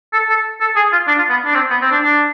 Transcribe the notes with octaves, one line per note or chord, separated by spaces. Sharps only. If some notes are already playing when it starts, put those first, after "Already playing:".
A4
A4
A4
G#4
F4
D4
F4
B3
D4
C4
B3
C4
D4
D4